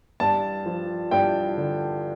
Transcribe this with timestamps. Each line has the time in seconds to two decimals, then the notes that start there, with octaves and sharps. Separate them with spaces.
0.20 G2 A5
0.66 F3
1.11 G2 G5
1.57 D3